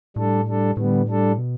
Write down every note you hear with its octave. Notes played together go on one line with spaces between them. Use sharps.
A2 G3 D4 A4
G3 D4 A4
A2 D3 G3 B3
G3 D4 A4
B2